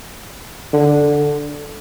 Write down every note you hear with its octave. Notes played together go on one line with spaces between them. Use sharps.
D3